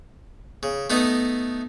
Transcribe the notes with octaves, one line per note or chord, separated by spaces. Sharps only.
C#3
A3 B3 D#4 D#5